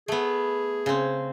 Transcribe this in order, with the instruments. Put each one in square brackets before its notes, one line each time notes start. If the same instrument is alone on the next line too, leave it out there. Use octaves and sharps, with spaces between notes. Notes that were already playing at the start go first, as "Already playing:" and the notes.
[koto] A3 B3 [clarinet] G#4
[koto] C#3 C4